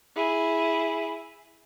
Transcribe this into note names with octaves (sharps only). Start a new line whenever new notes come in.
E4 G#4